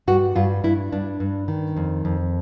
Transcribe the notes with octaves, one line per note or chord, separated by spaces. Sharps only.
G2 F#4
G2 F4
G2 E4
G2 D4
G2
D#3
F2
F2